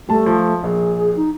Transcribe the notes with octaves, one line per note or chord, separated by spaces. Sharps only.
G3 A3 A5
F3
A#1 G#4
D#4